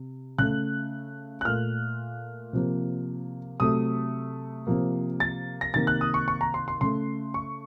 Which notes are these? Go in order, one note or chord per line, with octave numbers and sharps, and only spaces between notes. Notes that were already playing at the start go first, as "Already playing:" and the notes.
Already playing: C3
C#3 A3 F#6
F#6
A#2 A3 F6
C3 F3 A#3
C3 F#3 A3 D#6
C3 F3 A#3
A6
A#6
C3 D#3 A#3 A6
F#6
D#6
C#6
C#6
A#5
C6
C6
C#3 A3 C6
C#6